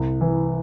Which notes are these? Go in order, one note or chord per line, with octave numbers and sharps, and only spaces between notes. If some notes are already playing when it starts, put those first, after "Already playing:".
Already playing: C2
E3